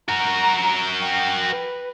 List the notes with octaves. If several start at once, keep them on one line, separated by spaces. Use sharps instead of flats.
F#4 A#4 A#5
G5
B4